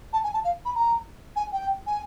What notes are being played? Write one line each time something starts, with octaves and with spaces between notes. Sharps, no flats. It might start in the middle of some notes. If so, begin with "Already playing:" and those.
A5
G#5
A5
F5
B5
A#5
G#5
G5
G#5